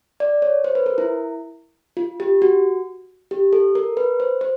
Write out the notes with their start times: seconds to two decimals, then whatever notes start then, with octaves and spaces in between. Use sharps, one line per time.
0.20 D5
0.42 C#5
0.64 C5
0.75 B4
0.86 A#4
0.98 E4
1.97 F4
2.20 G4
2.42 F#4
3.31 G4
3.53 A4
3.75 A#4
3.97 B4
4.20 C5
4.41 C5